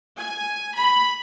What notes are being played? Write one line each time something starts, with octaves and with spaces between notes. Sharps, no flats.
G#5
B5